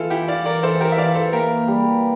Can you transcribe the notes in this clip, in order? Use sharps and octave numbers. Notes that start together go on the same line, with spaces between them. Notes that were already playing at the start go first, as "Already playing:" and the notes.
Already playing: E3 F4 A4
E4 G4
E3 D5 F5
A#4 D5
E3 A4 C5
G4 A#4
E5
E3 D5 F5
A4 C5
A#3 G4 A#4
G3